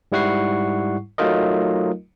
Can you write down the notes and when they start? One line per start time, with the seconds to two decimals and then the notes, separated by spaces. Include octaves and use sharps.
0.12 G#2 G3 E4 F#5 C#6 C7
1.18 F#3 A3 D#4 F4 A#4 D#5